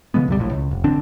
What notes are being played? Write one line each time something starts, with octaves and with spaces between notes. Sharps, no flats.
C#3 E3 G#3 B3
C#2 F#2 C3 G3
A#1 A2
C#2
F1
A1 D3 C4 D4